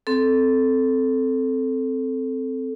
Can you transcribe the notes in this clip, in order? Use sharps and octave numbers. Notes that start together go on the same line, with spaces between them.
C4 A4